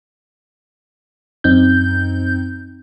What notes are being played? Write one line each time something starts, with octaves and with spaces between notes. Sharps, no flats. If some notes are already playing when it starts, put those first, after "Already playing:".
F#2 C4 D#4 G6